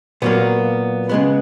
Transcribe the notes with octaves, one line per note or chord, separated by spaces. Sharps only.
A#2 F#3 A#3 B3
C#3 G#3 B3